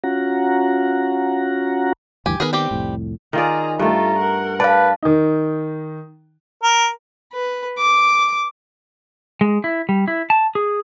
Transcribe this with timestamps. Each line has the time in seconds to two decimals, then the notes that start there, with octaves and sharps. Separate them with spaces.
0.04 C#4 F4 F#4 F#5 A#5
2.26 D2 G2 E3 G4 G#5
2.40 D#3 B3 G#4 A#4 B4
2.53 G3 C4 G4
2.71 C2 F2 A2
3.33 D#3 F4 G#4 D5 A#5
3.79 G2 A3 F4 A4 A#5
4.19 A#4 F#5
4.60 B4 D5 F5 A5
5.03 D#3 D#4
6.63 A#4
7.33 B4
7.78 D6
9.41 G#3
9.64 E4
9.89 G3
10.08 E4
10.30 A5
10.55 G#4